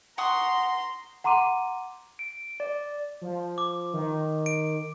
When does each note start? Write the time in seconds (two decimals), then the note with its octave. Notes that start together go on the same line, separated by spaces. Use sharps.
0.18 F#5 A#5 C6 C#6 D#6
1.24 F#5 A#5 C6 D6 D#7
2.19 D7
2.60 D5
3.21 F3
3.58 D6
3.93 D#3
4.46 D7